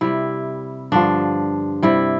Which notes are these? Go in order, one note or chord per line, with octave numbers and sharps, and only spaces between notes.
C3 G3 E4
G2 D3 F3 D4
C3 G3 E4